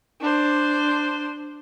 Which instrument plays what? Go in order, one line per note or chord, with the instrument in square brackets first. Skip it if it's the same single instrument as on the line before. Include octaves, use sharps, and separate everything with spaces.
[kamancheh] D4 C5